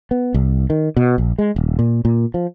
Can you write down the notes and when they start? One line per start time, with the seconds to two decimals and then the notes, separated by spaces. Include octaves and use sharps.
0.11 B3
0.34 C2
0.70 D#3
0.96 B2
1.18 A#1
1.38 G#3
1.56 D#1
1.79 A#2
2.05 A#2
2.34 F3